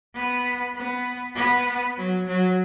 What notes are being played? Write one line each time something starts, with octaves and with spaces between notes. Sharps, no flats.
B3
B3
B3
F#3
F#3